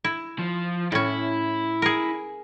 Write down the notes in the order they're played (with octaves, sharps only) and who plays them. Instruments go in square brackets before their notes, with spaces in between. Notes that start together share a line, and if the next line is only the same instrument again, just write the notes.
[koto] E4
[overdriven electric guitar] F3
[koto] A2 C#4 [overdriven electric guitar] E4
[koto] G#4 A#4